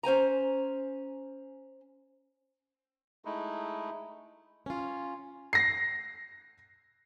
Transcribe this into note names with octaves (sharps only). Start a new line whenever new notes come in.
C#4 C5 G#5 A#5
G#3 A3 D#4 E4
C#4 F4
A#6 C7